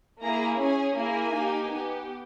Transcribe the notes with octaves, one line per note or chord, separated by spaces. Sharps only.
A#3 E4 G#4 A#5
C#4 G#4 G#5
A#3 E4 G#4 G#5
A#3 D#4 G4
B3 G4